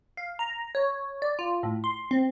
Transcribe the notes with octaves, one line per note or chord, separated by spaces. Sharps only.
F5
A#5
C#5
D5
F4
A2
C6
C4